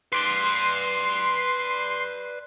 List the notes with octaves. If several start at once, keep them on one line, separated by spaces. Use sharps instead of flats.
B4 D5 C6